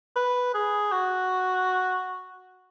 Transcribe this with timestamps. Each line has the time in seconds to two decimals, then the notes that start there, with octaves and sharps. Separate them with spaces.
0.16 B4
0.54 G#4
0.92 F#4